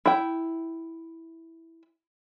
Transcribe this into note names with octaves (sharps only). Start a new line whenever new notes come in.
E4 G5